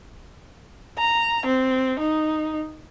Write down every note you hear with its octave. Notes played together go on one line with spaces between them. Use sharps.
A#5
C4
D#4